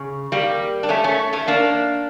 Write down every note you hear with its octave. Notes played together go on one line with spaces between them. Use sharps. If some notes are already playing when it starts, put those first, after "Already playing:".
Already playing: C#3
G3 A#3
D4
A3 C#4
A3 C#4
A3 C#4
A#3 D4